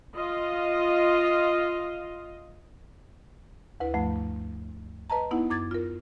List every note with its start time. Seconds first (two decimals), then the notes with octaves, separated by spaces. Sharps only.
0.16 F4 D#5
3.80 D2 E4 B4
3.94 D2 G2 F3 A3
5.10 B4 D#5 A5 A#5
5.31 B3 D#4 E4 F#5
5.50 F#2 D6 G#6 A6
5.71 F4 A#4